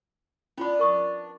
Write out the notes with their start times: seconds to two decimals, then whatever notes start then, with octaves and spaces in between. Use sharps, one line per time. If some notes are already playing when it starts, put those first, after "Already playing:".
0.58 B3 C#4 D4 F4 B5
0.79 A#4 C#6 D#6